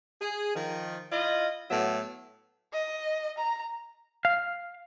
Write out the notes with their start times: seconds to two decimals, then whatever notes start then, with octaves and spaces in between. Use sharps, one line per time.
0.20 G#4
0.56 D#3 F3
1.12 E4 F4 D#5
1.70 A2 F#3 B3 E5
2.73 D#5
3.38 A#5
4.25 F5